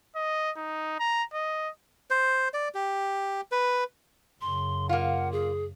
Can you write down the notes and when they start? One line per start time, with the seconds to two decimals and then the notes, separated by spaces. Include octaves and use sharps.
0.16 D#5
0.57 D#4
0.99 A#5
1.34 D#5
2.10 C5
2.54 D5
2.75 G4
3.52 B4
4.41 F#2 C#3 C6
4.89 A#3 F4 F#5
5.32 G#4